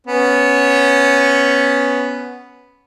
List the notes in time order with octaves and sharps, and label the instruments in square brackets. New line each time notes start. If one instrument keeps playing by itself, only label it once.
[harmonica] B3 C#4